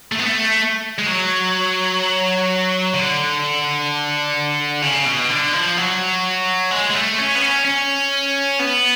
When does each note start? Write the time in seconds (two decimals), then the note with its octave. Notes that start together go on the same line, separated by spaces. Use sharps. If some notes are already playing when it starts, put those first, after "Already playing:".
0.12 A3
0.19 B3
0.26 A3
0.98 G#3
1.06 F#3
2.94 D3
4.82 C#3
5.06 B2
5.30 D3
5.53 F3
5.77 F#3
6.71 G#3
6.90 G#3
6.94 A3
7.18 C#4
7.35 B3
7.41 C#4
7.65 C#4
8.60 B3